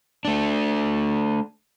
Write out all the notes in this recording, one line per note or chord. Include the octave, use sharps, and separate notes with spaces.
A3 D4